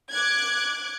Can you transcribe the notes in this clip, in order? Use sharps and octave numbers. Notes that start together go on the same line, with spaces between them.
D6 F#6 G#6